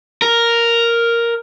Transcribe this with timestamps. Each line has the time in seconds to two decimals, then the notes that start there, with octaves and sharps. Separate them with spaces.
0.22 A#4